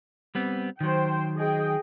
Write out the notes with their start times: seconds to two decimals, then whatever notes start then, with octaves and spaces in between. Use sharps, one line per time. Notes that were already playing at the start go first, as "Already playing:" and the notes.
0.35 G3 B3 C4
0.81 D#3 F#3 C5 G5
1.37 G#4 D#5 G5